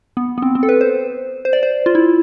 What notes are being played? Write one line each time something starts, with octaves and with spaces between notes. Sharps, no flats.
B3
B3
C4
C4
A4
B4
C5
C5
D5
C5
F4
E4